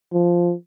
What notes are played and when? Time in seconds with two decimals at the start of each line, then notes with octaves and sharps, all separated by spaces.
0.13 F3